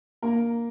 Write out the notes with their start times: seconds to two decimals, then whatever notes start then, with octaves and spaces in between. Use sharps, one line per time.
0.22 A#3 A#4